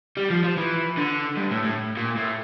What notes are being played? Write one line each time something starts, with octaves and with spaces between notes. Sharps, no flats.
G3
F3
F3
E3
D3
G2
A2
A2
A#2
A2